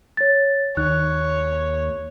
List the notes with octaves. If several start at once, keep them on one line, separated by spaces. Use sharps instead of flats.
C#5 A6
D#2 C#5 F#6